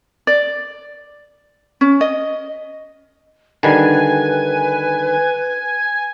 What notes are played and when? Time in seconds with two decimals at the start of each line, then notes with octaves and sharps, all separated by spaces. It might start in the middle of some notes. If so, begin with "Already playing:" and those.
0.27 D5
1.81 C#4
2.01 D#5
3.63 D3 D#3 G3 B4 G#5